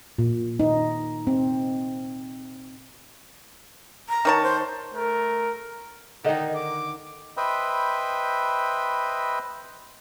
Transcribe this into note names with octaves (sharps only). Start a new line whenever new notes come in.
A#2
D#4
C4
A#5
D#3 C#5 A5
C5
A3 A#4
D3 D#3 D#4 A#4 D#5
D6
B4 C5 D#5 E5 G5 B5